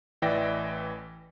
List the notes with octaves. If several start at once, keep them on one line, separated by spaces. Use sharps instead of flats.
A1 E3 D5 E5 G5 A#6